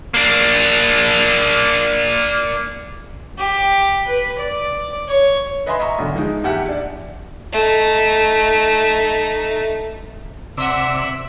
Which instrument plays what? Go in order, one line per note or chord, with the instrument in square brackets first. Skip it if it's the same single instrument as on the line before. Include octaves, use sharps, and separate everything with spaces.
[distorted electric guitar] A#3 D4
[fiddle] G4
B4
D5
C#5
[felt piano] B4 D#5 E5 G#5 B5 C6
D#5 E5 A#5 C#6
B1 D3
F3 G#3 D#4
E2 G4 E5 F#5
D4 D5
[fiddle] A3 D#4
[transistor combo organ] C3 D5 E6 [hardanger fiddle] E5 F#5